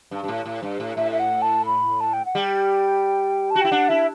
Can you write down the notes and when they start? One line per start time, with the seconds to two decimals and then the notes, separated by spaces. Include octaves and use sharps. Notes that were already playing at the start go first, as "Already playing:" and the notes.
0.11 G2
0.23 G2
0.28 A2
0.45 A2
0.63 G2
0.80 A2
0.97 A2 E5
1.12 E5
1.20 F#5
1.42 A5
1.66 B5
2.01 A5
2.13 G5
2.25 F#5
2.35 G3 G5
3.51 F#4 A5
3.61 E4 G5
3.72 D4 F#5
3.89 E4 E5